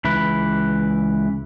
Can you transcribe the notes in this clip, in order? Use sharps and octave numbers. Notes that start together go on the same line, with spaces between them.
C#2 E3 B4